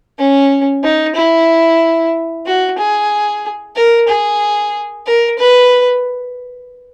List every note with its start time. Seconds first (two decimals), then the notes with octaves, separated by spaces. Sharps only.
0.18 C#4
0.83 D#4
1.15 E4
2.46 F#4
2.79 G#4
3.76 A#4
4.08 G#4
5.06 A#4
5.38 B4